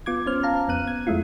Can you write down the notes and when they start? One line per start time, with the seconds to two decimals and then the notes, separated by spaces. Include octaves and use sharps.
0.06 B3 F4 D6 G#6
0.26 C#4 C5 F6
0.43 F5 A5 A#5
0.68 F2 B3 F#6 D#7
0.87 G#6
1.07 F2 G#3 A3 E4 F4